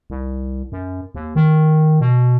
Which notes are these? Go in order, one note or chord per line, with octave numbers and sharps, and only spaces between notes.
C2
F#2
D#2
D#3
B2